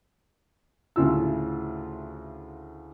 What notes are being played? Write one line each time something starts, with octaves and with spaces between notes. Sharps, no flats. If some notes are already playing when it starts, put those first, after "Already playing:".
D2 A2 C#3 F4 E6